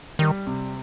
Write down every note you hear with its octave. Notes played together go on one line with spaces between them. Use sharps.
D#3 G3
C3